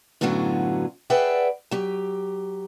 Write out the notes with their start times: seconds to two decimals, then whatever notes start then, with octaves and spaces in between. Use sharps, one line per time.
0.21 F#2 A2 D3 F#3 B3 F4
1.10 G#4 B4 D5 E5 F#5 G5
1.71 F#3 G4